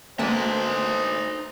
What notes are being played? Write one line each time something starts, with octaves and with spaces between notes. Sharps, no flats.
D2 G#3 A#3 B3 D#4 C5 A5